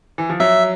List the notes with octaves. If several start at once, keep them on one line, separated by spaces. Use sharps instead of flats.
E3
F3
F#3 E5